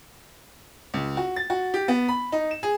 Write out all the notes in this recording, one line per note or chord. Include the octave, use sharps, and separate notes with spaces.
C#2
F#4
A6
F#4
G4
B3
B5
D#4
E7
G#4